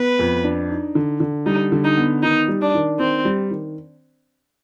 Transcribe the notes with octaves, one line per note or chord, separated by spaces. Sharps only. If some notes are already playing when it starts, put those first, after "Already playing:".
Already playing: B3 B4
F2
D4
D#4
D3
D3
G3 D#4
D3
D#4
B3
D#3 D#4
G3
D4
D#3
D#3 C4
G3
D#3